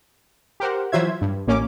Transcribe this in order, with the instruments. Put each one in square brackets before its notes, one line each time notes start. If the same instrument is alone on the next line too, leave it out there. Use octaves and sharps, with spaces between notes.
[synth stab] G4 A#4 C5 F#5
E3 F#3 F4 C5 E5 G#6
G2
A1 A#3 C#4 D6